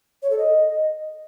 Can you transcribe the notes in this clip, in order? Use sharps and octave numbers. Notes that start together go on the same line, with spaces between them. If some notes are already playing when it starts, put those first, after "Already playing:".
C#5
A4
D#5